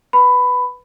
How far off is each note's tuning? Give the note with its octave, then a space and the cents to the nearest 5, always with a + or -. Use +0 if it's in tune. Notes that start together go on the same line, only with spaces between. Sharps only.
B4 +0 B5 +15